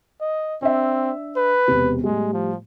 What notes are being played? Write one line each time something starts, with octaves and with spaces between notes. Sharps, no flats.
D#5
C4 D4 E5
B4
E1 C3
A2 G3 G#3
F3